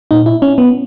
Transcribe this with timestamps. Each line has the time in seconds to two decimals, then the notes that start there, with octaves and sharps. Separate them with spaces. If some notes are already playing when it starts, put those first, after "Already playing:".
0.11 A#2 D#4
0.26 E4
0.42 C#4
0.58 B3